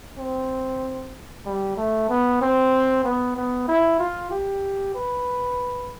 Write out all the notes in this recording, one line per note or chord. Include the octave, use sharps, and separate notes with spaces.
C4
G3
A3
B3
C4
B3
B3
E4
F4
G4
B4